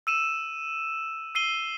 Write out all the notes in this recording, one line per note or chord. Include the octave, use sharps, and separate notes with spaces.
E6 D#7 E7
E6 C7 D#7 G7